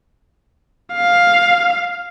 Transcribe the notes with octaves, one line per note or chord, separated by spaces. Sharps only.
F5